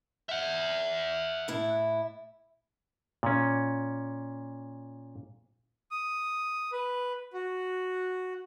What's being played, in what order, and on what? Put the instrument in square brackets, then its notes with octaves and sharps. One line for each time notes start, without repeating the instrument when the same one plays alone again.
[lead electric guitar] E5 F#5
[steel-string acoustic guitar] A2 E4
[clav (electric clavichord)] A#2 C#4
[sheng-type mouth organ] D#6
B4
F#4